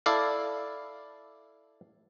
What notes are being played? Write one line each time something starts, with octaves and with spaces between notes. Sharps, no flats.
E4 A4 D5 F5